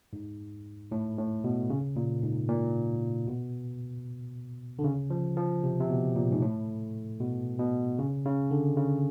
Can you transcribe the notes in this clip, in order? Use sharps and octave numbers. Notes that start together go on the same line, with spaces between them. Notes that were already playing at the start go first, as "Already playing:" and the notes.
G#2
A2
A2
B2
C#3
A#2
G#2
A#2
B2
D3
C#3
F3
F3
C3
C3
B2
A#2
G#2
A2
B2
B2
C#3
C#3
D3
C#3